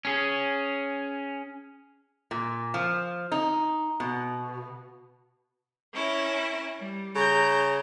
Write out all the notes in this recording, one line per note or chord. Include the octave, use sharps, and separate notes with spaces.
C#4 G#4
A#2
F3
D#4
B2
C#4 E4 A#4
G3
C#3 A#5 G6